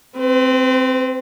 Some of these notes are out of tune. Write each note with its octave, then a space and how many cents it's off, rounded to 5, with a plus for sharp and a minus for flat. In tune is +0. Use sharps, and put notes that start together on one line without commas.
C4 +0 B4 +45